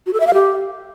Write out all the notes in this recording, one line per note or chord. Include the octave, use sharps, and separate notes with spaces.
F#4
A4
E5
F5
G4